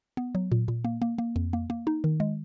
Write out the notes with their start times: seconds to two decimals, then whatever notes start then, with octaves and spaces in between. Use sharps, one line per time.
0.17 B3
0.35 F#3
0.52 A#2
0.68 A#2
0.85 A#3
1.02 A#3
1.18 A#3
1.36 F2
1.53 A#3
1.70 A#3
1.87 D#4
2.04 D#3
2.20 G#3